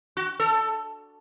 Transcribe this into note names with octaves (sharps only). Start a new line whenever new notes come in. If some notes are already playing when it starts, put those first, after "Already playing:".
F#4
A4